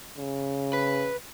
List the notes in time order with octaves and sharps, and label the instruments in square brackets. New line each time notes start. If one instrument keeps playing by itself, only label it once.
[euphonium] C#3
[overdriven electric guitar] B4